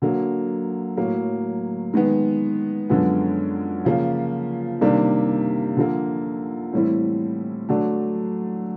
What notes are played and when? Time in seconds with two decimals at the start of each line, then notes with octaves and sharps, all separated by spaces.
0.02 D3 F#3 A#3
0.97 A2 F#3 A#3
1.94 D#3 G#3 B3
2.90 F#2 D3 F3 G#3 B3
3.85 C#3 F3 A#3
4.81 C3 D#3 G3 A#3 D4
5.77 D3 F3 A#3
6.73 A2 E3 G3 C4 E4
7.69 D3 F#3 A3 D4